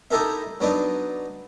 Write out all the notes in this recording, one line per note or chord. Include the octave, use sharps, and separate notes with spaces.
D#4 E4 G4 A4 A#4 E5
F#3 B3 D4 D#4